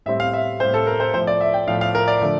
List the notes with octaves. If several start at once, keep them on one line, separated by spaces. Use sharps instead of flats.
A2 G3 C4 E5
F5
E5
A2 G3 C4 C5
A4
A#4
C5
A2 F3 A3 C5
D5
E5
G5
A2 F3 A3 F5
F5
A#4
D5
D3 F3 A3